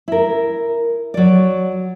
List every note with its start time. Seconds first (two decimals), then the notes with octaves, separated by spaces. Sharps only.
0.08 E4 A#4
1.14 F#3 D5